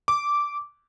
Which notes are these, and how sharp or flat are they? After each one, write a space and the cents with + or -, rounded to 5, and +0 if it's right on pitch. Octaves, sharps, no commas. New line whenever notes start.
D6 -10